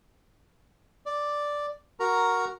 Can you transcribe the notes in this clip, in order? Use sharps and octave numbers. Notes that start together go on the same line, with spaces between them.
D5
F#4 A#4 A#5